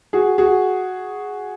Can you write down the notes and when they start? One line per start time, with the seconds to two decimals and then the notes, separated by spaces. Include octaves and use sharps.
0.13 F#4 G#4
0.38 F#4 G#4